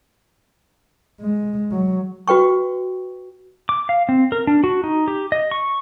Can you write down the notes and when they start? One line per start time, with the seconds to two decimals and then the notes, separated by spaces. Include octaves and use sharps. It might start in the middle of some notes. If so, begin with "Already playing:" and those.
1.21 G#3
1.71 F#3
2.28 F#4 B4 G5 C#6
3.69 D6
3.89 F5
4.09 C4
4.32 A#4
4.47 D4
4.64 F#4
4.84 D#4
5.08 G4
5.32 D#5
5.51 C#6